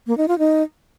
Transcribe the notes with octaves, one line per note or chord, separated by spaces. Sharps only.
A#3
D#4
F4
D#4